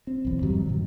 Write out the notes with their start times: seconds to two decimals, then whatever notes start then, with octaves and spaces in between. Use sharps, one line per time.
0.07 C4
0.25 B1 E2
0.42 G2 D#3 F#3 G3
0.66 A#2 D#3